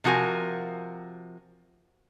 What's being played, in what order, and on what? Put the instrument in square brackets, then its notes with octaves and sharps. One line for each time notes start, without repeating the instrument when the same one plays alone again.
[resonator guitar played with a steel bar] C3 F3 F#4 A#4 G#5